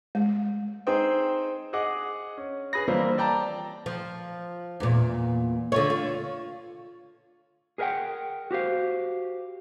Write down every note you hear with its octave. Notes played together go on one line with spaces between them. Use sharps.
G#3
C4 D#4 G#4 C5 G5
G#4 D#5 F#5 D6
C#4
G#4 B4 B5 A#6
E3 F3 G3 A#3 C4
D5 G5 A5 A#5
F3
E2 A#2
D3 F4 C#5
F4
G#4 A#4 B4 E5 F#5 G5
F#4 G4 C5 F5